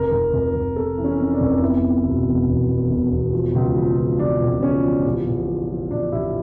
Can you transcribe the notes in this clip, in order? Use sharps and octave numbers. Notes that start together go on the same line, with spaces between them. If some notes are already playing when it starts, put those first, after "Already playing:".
Already playing: F1 A#4
F1
F1
F1
F2 A4
E3
C#4
F2
D4
F1
E2 E4
E2
E1
E1
E1
E2
E1
E1
F3
C#2
F3
C#2
C#2 D4
C#2
C#3 C#4
F3
A1
A1
F3
F3
A1 D4
A1 E4